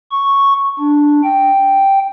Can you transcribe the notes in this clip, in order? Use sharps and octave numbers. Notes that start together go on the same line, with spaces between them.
C#6
D4
G5